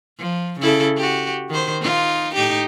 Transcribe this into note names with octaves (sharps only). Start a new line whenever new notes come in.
F3
C#3 E4 A4
F#4 G4
D#3 C5
D#4 F4
A2 D#4 G4